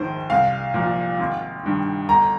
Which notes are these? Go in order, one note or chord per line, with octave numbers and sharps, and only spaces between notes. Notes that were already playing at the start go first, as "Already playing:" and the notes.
Already playing: A#1 G#2 D#3 C5
C2 F5
A#2 F3
G#1
G2 D#3
G1 A#5